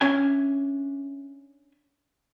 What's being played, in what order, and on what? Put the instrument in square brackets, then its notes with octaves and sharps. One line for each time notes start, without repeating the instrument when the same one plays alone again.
[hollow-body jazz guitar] C#4 D4 E5 G#5